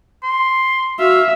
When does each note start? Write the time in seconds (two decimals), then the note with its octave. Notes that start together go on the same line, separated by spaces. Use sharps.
0.23 C6
0.99 F#4 E5 F5